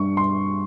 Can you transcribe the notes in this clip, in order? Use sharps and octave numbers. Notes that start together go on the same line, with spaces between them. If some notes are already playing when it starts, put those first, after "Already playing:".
Already playing: G2 C#6
C6